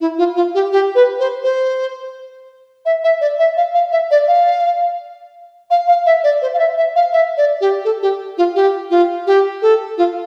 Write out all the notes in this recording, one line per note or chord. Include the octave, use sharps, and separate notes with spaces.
E4
F4
F4
G4
G4
B4
C5
C5
E5
E5
D5
E5
F5
F5
E5
D5
F5
F5
F5
E5
D5
C5
F5
E5
E5
F5
E5
D5
G4
A4
G4
F4
G4
F4
G4
A4
F4